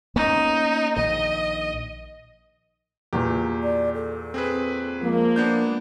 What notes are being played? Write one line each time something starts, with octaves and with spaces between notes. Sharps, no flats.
A#3 B3 C#4 D#4
A#1 D#3 D#5
E2 A#2 G4
D5
A4
C4 G#4 B4
F3 G#3 A#3
B3 D4 G6